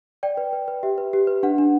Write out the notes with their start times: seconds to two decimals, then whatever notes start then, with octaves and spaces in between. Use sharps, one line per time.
0.23 D5 G5
0.37 B4
0.53 B4
0.68 B4
0.83 G4 E5
0.98 B4
1.13 G4
1.27 B4
1.43 D4 F#5
1.58 D4